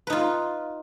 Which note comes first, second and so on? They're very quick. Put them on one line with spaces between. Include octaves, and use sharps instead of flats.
B4 D#4 F4